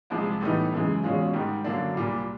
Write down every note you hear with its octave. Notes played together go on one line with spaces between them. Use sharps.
C2 C3 F3 G#3
A2 E3 G3 B3 D#4
F#2 C#3 E3 G#3
E2 B2 G#3 C#4 F4
G#2 D#3 G3
F#2 D3 F#3 A#3 D4
C2 A#2 G3